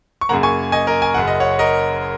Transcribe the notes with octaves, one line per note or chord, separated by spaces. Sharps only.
C#6
F#2 C#3 A#3 F#5 A#5
G#5 C#6
D#5 G#5
A#4 D#5
G#5
F#1 F#2 C#3 F#5
D#5
C#5 F#5
A#4 D#5